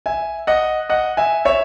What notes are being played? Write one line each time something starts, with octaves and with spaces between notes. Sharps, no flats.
E5 G#5
D#5 F#5
D#5 F#5
E5 G#5
C#5 E5